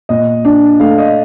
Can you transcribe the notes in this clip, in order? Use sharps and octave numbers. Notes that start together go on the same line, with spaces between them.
A#2 D#5
D4
A3 F5
D#5